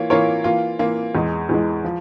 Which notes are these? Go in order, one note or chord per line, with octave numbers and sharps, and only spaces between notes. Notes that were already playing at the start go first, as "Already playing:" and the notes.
Already playing: E3 A#3 F4 C#5
E3 A#3 F4 A#4 C#5
E3 A#3 F4
E3 A#3 F4
E2 E3 G#3
E2 E3 G#3
F3